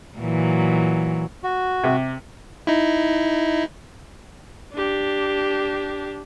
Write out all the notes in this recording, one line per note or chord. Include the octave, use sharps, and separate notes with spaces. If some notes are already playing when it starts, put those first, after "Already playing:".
A#2 E3 F#3
F#4
C3
D#4 E4
D4 G4